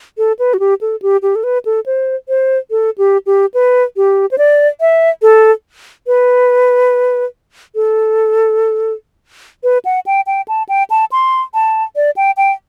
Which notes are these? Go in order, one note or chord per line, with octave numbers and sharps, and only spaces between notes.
A4
B4
F#4
G4
A4
G4
G4
A4
B4
A4
C5
C5
A4
G4
G4
B4
G4
C5
D5
E5
A4
B4
A4
B4
F#5
G5
G5
A5
G5
A5
C6
A5
D5
G5
G5